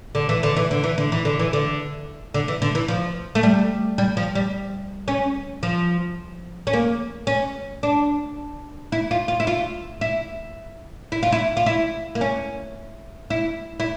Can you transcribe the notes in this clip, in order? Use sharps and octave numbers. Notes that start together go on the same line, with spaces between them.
D3
E3
D3
E3
D3
E3
D3
E3
D3
E3
D3
D3
E3
D3
E3
F3
A3
G3
G3
F3
G3
C#4
F3
C#4
A#3
C#4
D4
E4
F4
F4
E4
F4
E4
E4
F4
E4
F4
E4
A#3
C#4
E4
E4